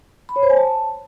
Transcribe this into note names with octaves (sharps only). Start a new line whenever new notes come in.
B5
C#5
C5
G#5
A5